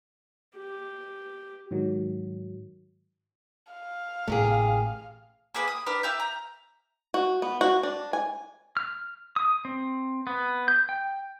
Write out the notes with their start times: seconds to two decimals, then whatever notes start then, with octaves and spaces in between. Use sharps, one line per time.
0.57 G4
1.71 G#2 D#3 F#3
3.73 F5
4.28 A1 C3 A3 A#3 G#4
5.54 A#3 G4 G#4 B4
5.68 D#6
5.86 D4 G4 A#4 B4
6.03 G4 E5 F5 G6
6.20 A#5
7.14 F#4
7.42 B3
7.61 F#4
7.83 D4
8.13 G#5
8.77 F6
9.36 D#6
9.65 C4
10.27 B3
10.68 G6
10.89 G5